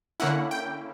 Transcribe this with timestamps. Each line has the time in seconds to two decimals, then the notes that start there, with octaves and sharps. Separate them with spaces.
0.20 D3 A#3 C#4 E4 F#5
0.51 G5